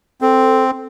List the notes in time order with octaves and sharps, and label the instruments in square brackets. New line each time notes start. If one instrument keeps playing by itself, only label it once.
[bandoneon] C4 [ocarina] A4